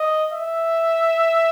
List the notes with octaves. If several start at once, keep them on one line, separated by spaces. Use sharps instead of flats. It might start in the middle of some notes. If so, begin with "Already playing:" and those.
Already playing: D#5
E5